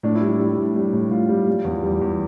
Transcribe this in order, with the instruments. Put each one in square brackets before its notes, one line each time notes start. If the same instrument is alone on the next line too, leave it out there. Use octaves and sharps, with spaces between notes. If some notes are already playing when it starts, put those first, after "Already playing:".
[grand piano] A2 D4
E4
G3
E4
G3
A2
G3
A2
A2 F4
G3
G3
E2
G3
E2